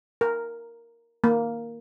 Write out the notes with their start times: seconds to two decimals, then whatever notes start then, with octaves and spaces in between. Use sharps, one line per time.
0.21 A#4
1.24 A#3